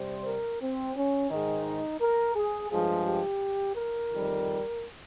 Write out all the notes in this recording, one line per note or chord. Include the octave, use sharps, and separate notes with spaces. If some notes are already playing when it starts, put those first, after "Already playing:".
Already playing: C3 G3 C5
A#4
C4
C#4
G#2 D#3 G#3 D#4
A#4
G#4
G2 F3 G#3 G#4
G4
A#4
F2 D#3 G3